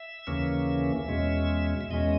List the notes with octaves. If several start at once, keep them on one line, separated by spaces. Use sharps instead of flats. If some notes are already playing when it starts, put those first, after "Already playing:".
Already playing: E5
D#2 C#3 E3 A#3 C#4
E2 B2 G#3 C#4
E5
E2 B2 G#3 C#4 D#5